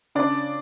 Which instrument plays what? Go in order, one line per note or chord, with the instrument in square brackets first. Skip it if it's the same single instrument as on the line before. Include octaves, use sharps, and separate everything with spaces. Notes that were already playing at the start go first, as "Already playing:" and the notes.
[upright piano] C#3 D4 D5